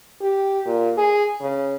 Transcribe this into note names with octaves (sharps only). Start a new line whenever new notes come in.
G4
A#2
G#4
C#3